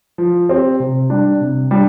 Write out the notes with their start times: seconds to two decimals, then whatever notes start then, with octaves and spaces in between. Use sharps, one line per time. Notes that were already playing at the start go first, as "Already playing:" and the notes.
0.18 F3
0.49 C4 G4
0.80 C3
1.10 G3 D4
1.41 C3
1.71 G3 D4